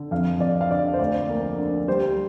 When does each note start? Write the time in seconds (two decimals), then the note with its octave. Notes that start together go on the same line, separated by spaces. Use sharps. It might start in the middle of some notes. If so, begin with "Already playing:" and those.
Already playing: D3
0.11 F2 F5
0.40 F2 D5
0.61 F5
0.71 D3 D5
0.94 C5
0.99 D2 D5
1.30 A#3
1.58 D3
1.88 G3 C5